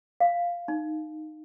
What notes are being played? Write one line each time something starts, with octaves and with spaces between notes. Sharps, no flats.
F5
D#4